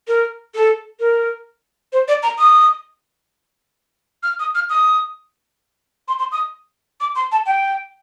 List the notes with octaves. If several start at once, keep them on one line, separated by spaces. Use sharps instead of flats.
A#4
A4
A#4
C5
D5
A#5
D#6
F6
D#6
F6
D#6
C6
C6
D#6
D6
C6
A5
G5